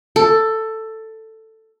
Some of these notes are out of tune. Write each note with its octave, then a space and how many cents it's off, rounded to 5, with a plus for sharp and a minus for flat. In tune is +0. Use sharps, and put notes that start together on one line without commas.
A4 +10